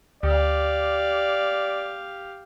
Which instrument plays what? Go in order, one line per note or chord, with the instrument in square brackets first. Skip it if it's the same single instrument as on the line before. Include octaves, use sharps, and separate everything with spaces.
[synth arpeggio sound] D2 [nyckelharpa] G4 F5 [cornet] D5